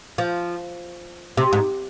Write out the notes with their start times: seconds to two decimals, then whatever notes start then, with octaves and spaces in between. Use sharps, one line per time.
0.18 F3
1.37 C3
1.53 G#2